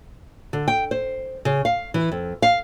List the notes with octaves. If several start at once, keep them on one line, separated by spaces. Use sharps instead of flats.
D3
G5
C5
C#3
F5
E3
F2
F5